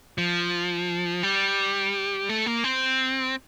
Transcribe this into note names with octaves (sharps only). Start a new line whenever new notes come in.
F3
G3
A3
A#3
C4